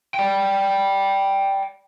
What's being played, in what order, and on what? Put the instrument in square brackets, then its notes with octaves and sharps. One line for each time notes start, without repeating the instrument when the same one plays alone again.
[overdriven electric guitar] D5 G5